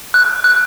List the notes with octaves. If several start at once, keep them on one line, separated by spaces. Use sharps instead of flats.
F#6
F#6